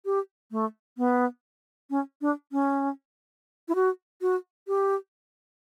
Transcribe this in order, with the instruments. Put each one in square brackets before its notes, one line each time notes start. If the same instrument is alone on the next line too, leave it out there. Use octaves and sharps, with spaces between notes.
[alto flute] G4
A3
B3
C#4
D4
C#4
E4
F#4
F#4
G4